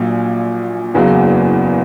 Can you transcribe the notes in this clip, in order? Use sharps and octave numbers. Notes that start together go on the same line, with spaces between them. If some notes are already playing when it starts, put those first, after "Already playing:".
Already playing: A#1 A#2 F#3
F#1 E2 C#3 F#3